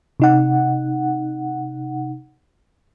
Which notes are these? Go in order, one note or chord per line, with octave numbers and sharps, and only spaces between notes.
C3 D#4 F#5